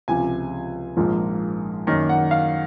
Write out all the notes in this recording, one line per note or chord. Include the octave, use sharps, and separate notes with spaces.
C#2 C3 F3 G#5
A#1 G#2 F3 A#3
F#2 D#3 A#3
F#5
F5